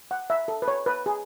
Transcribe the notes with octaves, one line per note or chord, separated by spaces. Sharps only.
F#5
E5
A4
B4
C#5
B4
G#4